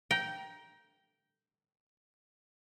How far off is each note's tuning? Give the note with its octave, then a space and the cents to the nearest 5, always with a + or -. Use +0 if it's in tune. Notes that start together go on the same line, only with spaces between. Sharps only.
G5 -10 A#5 +20